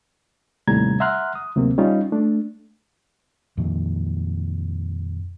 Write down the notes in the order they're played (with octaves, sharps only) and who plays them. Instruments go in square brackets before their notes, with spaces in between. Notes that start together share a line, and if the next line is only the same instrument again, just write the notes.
[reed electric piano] D#2 A2 C3 G3 A#5 G#6
E5 F#5 A#5 C6 F6 F#6
D#6
D2 C3 F#3 A#3 C4
G3 C#4 D#4 F4
A3 D4
[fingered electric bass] F2 A#2 D#3